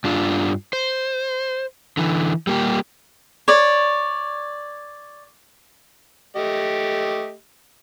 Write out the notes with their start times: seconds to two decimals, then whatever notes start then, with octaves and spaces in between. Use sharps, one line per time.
0.04 G2 D4 F4
0.73 C5
1.97 D3 E3
2.47 G3 A#3 G4
3.48 C#5 D5
6.36 A3 G4 D#5